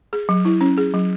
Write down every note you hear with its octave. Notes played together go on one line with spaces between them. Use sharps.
G#4
F#3
E4
C#4
G#4
F#3